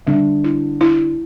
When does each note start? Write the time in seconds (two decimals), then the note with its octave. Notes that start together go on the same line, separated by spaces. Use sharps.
0.07 D3 G3
0.44 E4
0.81 E4